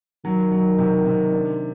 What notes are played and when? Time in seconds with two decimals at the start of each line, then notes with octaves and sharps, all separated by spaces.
0.24 D#3 F#3
0.52 F#3
0.79 C3
1.06 C3
1.32 D4